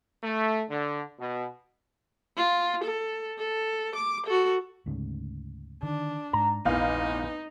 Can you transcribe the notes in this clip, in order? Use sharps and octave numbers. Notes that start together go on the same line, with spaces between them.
A3
D3
B2
F4
A4
A4
D6
F#4 A4
D2 G#2 C#3
D3 D#3 D4
G#2 A#5
F1 A#1 E2 D#4 F5